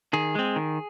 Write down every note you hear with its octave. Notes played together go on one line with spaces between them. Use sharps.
D#3 G#4
G#3 C4
D#3